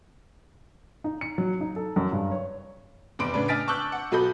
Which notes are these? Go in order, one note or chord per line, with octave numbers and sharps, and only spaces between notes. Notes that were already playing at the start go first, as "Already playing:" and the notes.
D#4
C#7
F#3
D#4
A4
F#2
G2
C#5
F1 E2 B5 C6 D6 D7
A2 C#3 D4 B4
D#5 G#5 F6 A6 B6 D7
A5 C#6 D6 E6 F#6 G6
F#5
B1 F#3 A4 D#5 B5 G6